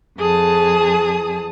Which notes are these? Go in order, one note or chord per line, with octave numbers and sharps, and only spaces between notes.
F2 G#4 A5 D#6